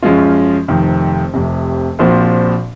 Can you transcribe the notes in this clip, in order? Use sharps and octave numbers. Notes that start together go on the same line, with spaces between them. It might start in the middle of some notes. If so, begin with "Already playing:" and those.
F#2 F3 G#3 C#4 F4
F1 F2 D#3
F1 F2 C3
A#1 A#2 F3 C4 F#4